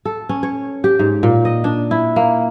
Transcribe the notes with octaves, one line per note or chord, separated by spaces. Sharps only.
A4
C#4
C#5
G4
G#2
A#2
D#5
D4
E4
A#3